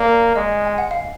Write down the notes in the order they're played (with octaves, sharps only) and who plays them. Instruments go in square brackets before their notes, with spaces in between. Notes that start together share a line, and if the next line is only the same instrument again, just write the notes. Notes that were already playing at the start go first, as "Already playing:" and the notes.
Already playing: [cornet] A#3 [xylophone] D5
[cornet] G#3 [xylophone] D#5
[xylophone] G#5
F#5
F5